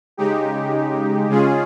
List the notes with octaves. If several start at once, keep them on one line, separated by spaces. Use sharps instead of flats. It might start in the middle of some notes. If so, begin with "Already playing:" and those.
C#3 G#3 D#4 G4
C#3 G#3 C#4 F4 G#4